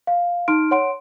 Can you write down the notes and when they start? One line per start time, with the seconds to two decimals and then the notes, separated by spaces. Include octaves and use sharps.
0.07 F5
0.48 D#4 C6 F6 D7
0.71 C#5 F#5 C6 D7